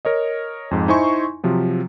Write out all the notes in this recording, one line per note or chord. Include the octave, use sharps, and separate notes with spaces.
A#4 C#5 D#5
F2 G#2
D#4 E4 C5 G#5 C6 C#6
C3 F3 F#3